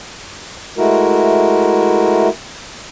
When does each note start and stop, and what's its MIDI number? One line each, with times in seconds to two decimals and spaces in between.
0.78 2.28 56
0.78 2.28 57
0.78 2.28 64
0.78 2.28 66
0.78 2.28 70